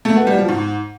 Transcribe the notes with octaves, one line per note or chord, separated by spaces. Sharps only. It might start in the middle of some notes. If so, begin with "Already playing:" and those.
A3
B3
G3
F3
G#2